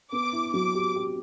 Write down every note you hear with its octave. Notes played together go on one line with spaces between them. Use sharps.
B3 D6
E4
F#3 D6
G4
G4